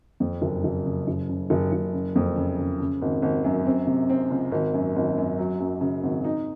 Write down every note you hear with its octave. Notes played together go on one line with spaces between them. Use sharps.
F2
F#1
F#1
C#3
F#1
C#3
F#1
F#1
C#3
F2
C#3
C#3
C#3
G#1
G#1
F#2
C4
C3
C4
C#2
G#1
F#2
G#1
F#2
F#3
F#2
C#3
G#1
D#4